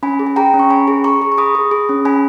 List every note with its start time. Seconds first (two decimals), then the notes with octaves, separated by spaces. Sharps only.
0.03 C#4 G#5 B5
0.19 G#4
0.27 G#5
0.36 G#4 G5 A#5
0.54 C#4
0.59 C#6
0.70 C#4 G#5 B5
0.88 G#4
1.04 G#4 A#5 C#6
1.22 G#4
1.32 C#6
1.38 G#4 B5 D#6
1.55 G#4
1.71 G#4
1.89 C#4
2.05 C#4 G#5 B5